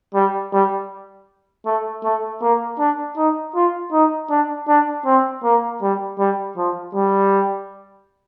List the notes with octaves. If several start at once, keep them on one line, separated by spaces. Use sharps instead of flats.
G3
G3
A3
A3
A#3
D4
D#4
F4
D#4
D4
D4
C4
A#3
G3
G3
F3
G3